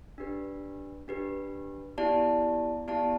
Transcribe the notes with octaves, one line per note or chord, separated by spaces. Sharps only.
D4 G4 B4
D4 G4 B4
B3 E4 G4 D5 A5
B3 E4 G4 D5 A5